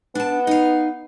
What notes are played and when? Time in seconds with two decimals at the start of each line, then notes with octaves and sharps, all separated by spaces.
0.15 B3 D4 A5
0.47 D#4 F5